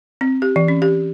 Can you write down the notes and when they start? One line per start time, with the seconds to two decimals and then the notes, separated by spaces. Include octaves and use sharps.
0.21 C4
0.42 G4
0.56 E3
0.68 C#4
0.82 G4